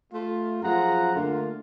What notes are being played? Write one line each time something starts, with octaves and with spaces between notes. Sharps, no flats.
A3 F4
F#2 F3 F4 G#4 F#5 A#5
D3 A3 A#3 D4 F4